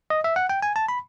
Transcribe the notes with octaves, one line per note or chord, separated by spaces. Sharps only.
D#5
E5
F#5
G5
G#5
A5
B5